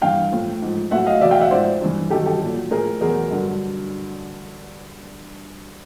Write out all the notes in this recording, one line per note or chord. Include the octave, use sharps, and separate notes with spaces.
G2 E3 F5 G5
A2 F3
G#2 F3
A2 F#3 E5 F#5
D#5 F5
E2 B2 F#3 D5 E5
F5 G5
E5 F#5
G#2 F3 C5 D5
G2 E3
G2 D#3 F#3 G4 A4
G4 A4
A#2 F#3
A2 F3 G#4 A#4
E2 B2 F#3 G#4 A#4
G2 D3 F#3